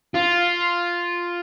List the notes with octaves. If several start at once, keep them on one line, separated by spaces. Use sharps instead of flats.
F4